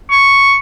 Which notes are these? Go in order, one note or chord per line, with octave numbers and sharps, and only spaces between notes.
C#6